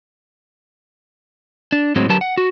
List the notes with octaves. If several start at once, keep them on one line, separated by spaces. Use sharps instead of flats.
D4
A2 F#3 G#3 C4
D3 F#3 G4 A#4 B4 A5
F#5
F#4